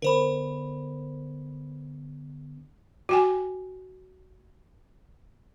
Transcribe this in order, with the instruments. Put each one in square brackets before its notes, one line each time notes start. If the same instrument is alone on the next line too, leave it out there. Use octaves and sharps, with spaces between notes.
[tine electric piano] D3 B3 [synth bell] A#4 C5 B5
[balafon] F#4 G5 G#5